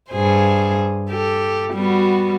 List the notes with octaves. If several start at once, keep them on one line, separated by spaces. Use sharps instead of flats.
G2 G#4 C5
G4 A4
G3 B3 F#4